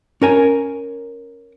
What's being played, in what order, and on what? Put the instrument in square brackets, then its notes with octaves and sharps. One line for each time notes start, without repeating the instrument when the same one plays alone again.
[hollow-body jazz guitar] C#4 A#4 G#5